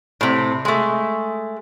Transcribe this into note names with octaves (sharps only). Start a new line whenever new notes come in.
A2 C3
G#3 A3